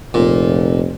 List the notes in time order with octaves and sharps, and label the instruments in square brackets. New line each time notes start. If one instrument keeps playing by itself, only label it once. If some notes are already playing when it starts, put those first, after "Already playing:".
[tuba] F1 [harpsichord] A#2